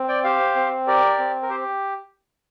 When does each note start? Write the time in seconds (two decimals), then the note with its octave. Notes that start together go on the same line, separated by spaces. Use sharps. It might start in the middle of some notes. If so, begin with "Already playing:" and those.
Already playing: C4
0.08 D5 G5
0.24 G4 C5 F5
0.56 C4
0.87 G4 A#4 D5
1.19 C4
1.42 A#4
1.49 G4 C5